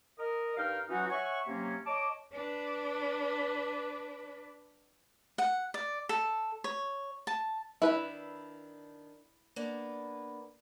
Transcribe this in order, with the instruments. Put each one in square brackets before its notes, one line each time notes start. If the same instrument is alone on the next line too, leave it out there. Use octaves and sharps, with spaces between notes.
[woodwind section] A#4 D#5
G2 D#4 A#4 F5 G5 F6
E3 F#3 C#4 D#4 F#4
C#5 E5 F#5 G#5 C#6
C3 F#3 A#3 C#4
C#5 D#5 A5 D6
[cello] D4 B4
[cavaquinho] F#5
D5
A4
C#5
A5
[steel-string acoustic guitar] D#3 D4 [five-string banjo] E4 B4
[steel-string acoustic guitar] A#3 B3 D4